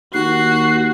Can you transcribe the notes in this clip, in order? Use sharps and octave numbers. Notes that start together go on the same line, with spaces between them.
D#2 F#4 F#6 C7